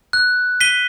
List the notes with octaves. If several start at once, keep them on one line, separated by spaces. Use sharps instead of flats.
F#6
B6 D#7 G7